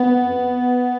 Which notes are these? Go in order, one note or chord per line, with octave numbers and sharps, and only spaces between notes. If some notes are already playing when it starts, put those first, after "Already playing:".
Already playing: B3
F2